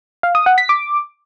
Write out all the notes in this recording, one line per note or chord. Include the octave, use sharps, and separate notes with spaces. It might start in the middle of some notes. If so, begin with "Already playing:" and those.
F5
D#6
F#5
B6
D6